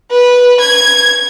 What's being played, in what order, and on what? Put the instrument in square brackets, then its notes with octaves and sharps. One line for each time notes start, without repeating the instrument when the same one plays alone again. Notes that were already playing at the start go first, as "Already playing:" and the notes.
[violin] B4
G#6